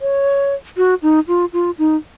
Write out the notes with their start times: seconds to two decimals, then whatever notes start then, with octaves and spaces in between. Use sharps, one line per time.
0.01 C#5
0.77 F#4
1.02 D#4
1.28 F4
1.53 F4
1.78 D#4